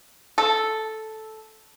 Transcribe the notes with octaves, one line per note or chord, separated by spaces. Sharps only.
A4